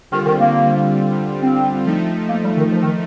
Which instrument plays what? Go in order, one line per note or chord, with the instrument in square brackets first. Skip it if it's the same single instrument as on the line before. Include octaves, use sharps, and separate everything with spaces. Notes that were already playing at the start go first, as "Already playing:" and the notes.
[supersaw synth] D3 G3 C4 F4 [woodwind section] D#3
[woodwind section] D#3
A#3
C4
[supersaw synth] F3 A3 D#4
[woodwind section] A#3
G3
D#3
F3
D#3